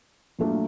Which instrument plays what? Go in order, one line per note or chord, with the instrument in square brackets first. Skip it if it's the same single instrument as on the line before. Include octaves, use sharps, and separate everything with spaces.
[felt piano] A#2 F#3 A3 D4 F4